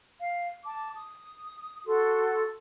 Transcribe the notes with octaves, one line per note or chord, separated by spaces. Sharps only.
F5
A5 D6
D#6
F#4 A4 C6